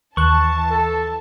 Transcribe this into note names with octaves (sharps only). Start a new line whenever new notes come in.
D#2 E3 A5 C#6 F#6
A4